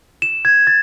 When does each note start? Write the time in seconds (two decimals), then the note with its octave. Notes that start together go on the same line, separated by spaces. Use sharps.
0.22 E7
0.45 G#6
0.67 A6